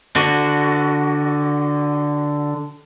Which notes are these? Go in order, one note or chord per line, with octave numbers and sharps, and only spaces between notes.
D3 F#4